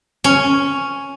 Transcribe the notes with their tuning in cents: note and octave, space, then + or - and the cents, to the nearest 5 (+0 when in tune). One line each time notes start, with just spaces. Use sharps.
C#4 +0 G#5 +0